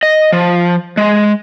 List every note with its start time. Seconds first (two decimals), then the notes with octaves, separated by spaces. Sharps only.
0.03 D#5
0.32 F3
0.97 G#3